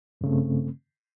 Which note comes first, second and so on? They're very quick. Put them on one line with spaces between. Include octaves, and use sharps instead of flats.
G2 C#3 A3 C4